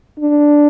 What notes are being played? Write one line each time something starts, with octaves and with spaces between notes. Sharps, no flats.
D4